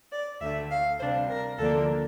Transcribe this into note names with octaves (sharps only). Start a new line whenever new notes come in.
D5
D2 D3 A3 E5
F5
C3 G3 D4 C5
A#4
D2 D3 F3 A#3 D4 A4